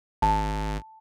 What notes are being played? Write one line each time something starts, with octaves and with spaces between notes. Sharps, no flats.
G#1 A5